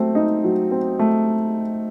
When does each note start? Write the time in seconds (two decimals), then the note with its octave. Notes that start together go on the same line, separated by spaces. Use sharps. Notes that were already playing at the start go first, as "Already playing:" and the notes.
Already playing: F#3 A3 C4
0.15 D#4
0.44 F#3
0.71 C4
0.99 A3